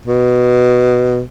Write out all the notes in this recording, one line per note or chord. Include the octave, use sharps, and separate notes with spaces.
B2